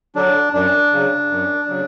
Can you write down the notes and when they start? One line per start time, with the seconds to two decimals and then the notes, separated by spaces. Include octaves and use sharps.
0.15 D3 F#3 D4
0.53 F#2 D4
0.92 C#3 F#3
1.31 F#2
1.69 C#3 F#3